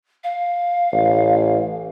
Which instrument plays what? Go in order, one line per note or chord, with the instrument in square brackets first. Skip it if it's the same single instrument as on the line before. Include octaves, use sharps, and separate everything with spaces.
[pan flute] F5
[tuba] A1